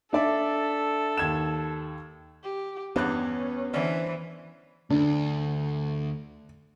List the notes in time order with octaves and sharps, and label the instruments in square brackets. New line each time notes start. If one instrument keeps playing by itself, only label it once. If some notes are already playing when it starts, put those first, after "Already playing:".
[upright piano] D4 D5 E5 [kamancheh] A4
[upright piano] D#2 G#6 E7
[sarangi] G4
[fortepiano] E2 G2 F#6 [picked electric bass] B3 [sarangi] C#4
[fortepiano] D3 C#4 D4 [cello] E3 [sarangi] C5
[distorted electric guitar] D2 [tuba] A3 [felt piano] D4